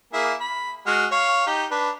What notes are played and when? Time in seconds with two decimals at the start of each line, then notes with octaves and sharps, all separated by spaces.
0.13 A#3 E4 G#4
0.41 B5
0.87 G#3 F#4 F6
1.12 C#5 F5
1.47 D#4 G4
1.71 D4 B4